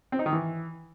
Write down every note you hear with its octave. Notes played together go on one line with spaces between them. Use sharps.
C4
D#4
D#3
E3